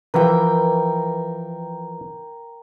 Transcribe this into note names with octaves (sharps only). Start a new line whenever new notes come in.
E3 F3 A#4 B4 G5